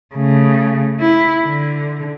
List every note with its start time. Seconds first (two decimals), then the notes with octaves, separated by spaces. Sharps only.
0.15 C#3 A3
1.00 E4
1.46 D3